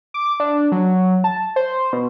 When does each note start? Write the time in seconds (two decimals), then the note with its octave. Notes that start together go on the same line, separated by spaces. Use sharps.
0.14 D6
0.40 D4
0.72 F#3
1.24 A5
1.56 C5
1.93 B2